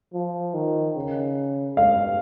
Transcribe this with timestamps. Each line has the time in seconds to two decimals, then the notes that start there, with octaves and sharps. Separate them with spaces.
0.14 F3
0.54 D#3
0.96 C#3
1.77 G2 F5